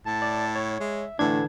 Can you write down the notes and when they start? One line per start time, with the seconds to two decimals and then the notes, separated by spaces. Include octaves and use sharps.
0.06 A2 A5
0.22 D5
0.55 C#5
0.80 G#3 E5
1.19 A2 D3 E3 A3 D4 A5 G#6